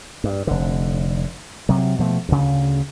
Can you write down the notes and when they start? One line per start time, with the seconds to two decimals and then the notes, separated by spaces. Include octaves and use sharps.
0.24 G2
0.47 F1 D3
1.69 C3 F#3
1.99 B2 F3 G#3 A3
2.29 D2 C#3